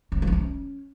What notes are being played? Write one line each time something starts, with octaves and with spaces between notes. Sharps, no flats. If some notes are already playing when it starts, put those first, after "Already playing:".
C#4
E3
F3
C4
C#4